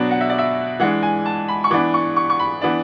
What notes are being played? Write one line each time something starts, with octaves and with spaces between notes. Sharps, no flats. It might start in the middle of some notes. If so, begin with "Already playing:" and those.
Already playing: B2 F#3 B3 D4
F#5
E5
D5
E5
E3 G#3 D4 F#5
G#5
A5
B5
C#6
E3 B3 D4 D6
C#6
C#6
C#6
B5
E3 B3 D4